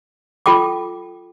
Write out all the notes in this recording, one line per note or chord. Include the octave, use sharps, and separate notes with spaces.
F4 A4 G5 D6